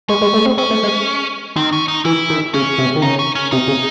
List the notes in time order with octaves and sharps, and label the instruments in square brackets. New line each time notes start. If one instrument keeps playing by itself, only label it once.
[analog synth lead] G#3 [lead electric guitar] C#4
[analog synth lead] G#3
A3
C4
[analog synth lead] C4 [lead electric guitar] C#4
[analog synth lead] A3
G#3
[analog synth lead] D#3 [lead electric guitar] C4
[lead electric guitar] C#4
D#4
[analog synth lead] E3 [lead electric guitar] E4
[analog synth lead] D#3
[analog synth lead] C#3 [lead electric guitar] C#4
[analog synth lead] C3
D#3
[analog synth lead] C#3 [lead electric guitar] D#4
[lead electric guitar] C#4
C#4
[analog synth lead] C3 [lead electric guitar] D#4
[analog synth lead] C#3